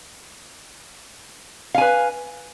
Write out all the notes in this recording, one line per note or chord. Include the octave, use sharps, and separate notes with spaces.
B4 F5 G#5